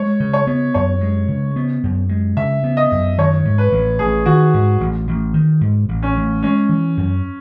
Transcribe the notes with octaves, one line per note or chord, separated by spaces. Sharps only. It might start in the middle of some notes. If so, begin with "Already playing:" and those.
Already playing: G#3 C#5
C#3
C#5
B3
F#2 C#5
G#3
C#3
B3
F#2
G#3
C#3 E5
B3
D#5
F#2
D#3 C#5
G#2
B4
A1
A1 G#4
D#3 F#4
G#2
A1
A1
D#3
G#2
A1
C#4
A1
G#3 C#4
E3
F#2